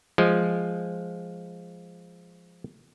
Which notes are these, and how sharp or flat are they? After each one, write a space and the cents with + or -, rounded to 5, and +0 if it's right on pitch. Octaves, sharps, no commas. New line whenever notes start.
F3 +0 G#3 +0